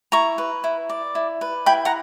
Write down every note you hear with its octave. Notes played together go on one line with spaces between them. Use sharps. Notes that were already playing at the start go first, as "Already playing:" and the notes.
E4 A#5 C#6
B4
E4
D5
E4
B4
E4 G5 B5
F#5 A#5